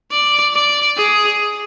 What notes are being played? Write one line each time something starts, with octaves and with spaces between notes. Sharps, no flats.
D5
D5
G#4